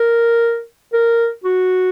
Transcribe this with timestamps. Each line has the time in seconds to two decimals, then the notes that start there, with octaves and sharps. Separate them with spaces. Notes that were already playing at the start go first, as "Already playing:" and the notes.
Already playing: A#4
0.93 A#4
1.44 F#4